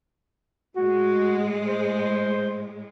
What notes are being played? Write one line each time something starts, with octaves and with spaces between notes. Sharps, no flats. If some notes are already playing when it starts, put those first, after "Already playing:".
A2 G#3 F#4
C5